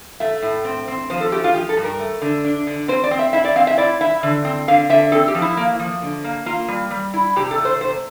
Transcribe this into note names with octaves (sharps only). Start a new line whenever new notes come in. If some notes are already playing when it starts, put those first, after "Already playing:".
A3 E5
A2
C4
C4
F3 C5
A4
A3 G4
F4
F3 G4
A4
G2
A#4
A3
D3
D4
D3
C4 C5
D5
C4
E5
E4 E5
D5
C4 F5
E5
E4 D5
E4 E5
D3
C4
D3 F5
D3 E5
C4 A4
G4
F3
E4
A#3
F3
D3
A#3
A#3 F4
G3
G3
E4
C3 G4
A4
A3
C5
C3 C5